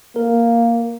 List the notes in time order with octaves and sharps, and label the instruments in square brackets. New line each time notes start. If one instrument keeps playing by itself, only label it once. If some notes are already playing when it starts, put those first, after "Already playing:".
[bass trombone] A#3 [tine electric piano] A#4